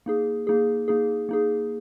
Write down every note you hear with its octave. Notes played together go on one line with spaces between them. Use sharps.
A#3 D#4 G#4
A#3 D#4 G#4
A#3 D#4 G#4
A#3 D#4 G#4